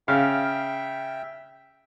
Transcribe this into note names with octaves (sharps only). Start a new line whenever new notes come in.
C#3 E5 F5 G5